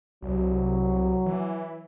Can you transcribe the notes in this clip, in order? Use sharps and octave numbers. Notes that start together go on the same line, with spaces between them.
C2 F#3
E3